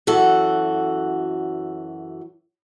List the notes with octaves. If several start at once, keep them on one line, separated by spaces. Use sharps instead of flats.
F#2 E3 F#4 A4